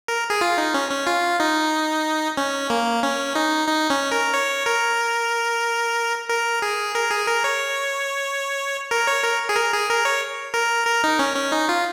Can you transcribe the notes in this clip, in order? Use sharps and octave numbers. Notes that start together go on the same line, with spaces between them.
A#4
G#4
F4
D#4
C#4
C#4
F4
D#4
C#4
A#3
C#4
D#4
D#4
C#4
A#4
C#5
A#4
A#4
G#4
A#4
G#4
A#4
C#5
A#4
C#5
A#4
G#4
A#4
G#4
A#4
C#5
A#4
A#4
D#4
C#4
C#4
D#4
F4